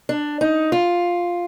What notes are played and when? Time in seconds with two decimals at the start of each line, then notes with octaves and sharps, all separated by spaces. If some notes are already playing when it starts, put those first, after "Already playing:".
0.09 D4
0.41 D#4
0.72 F4